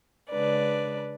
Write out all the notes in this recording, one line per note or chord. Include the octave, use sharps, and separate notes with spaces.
C#3 G#3 D4 B4 D5